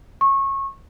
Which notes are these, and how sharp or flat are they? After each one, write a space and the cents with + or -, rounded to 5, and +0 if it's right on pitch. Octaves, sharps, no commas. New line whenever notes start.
C#6 -25